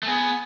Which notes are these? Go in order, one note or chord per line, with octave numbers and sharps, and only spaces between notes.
A3
B3 G#4